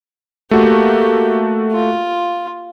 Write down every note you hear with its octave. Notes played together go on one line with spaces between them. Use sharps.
A3 A#3 F#4 G4 A4
F4